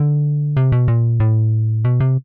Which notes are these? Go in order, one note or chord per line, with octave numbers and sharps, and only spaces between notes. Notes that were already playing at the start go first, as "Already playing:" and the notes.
Already playing: D3
C3
B2
A#2
A2
B2
C3